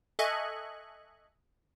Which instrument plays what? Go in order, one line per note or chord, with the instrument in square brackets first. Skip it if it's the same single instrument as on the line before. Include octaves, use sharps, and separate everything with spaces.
[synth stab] A4 D#5 E5 G#5 C#6 F#6